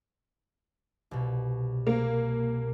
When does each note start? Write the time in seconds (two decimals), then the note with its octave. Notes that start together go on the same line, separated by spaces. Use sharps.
1.11 C2 B2
1.87 A#3